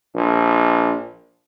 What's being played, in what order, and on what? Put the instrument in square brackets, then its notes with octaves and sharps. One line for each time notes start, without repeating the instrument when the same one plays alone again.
[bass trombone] A#1